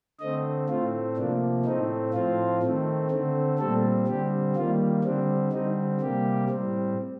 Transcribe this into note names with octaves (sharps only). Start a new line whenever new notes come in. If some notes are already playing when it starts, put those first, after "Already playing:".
D3 A3 C4 D#5
A2 A3 C4 F4
C3 F3 A#3 D4
A2 A3 C4 D#4
A2 F3 C4 F4
D#3 A3 C4
D3 A3 C4
A#2 G3 C4 A4
D3 G3 C4 G4
D#3 G3 A#3 F4
D3 G3 C4 D4
D3 G3 C4 D#4
C3 G3 A#3 G4
A2 G3 C4